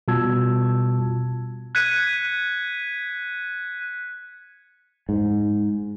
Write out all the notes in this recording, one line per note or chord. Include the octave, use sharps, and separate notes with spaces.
B2 G3 F4 A5 E6 G#6
F#6 G#6 B6 C#7 D#7
G#2